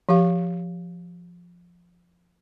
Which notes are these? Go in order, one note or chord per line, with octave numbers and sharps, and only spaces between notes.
F3 G4 F5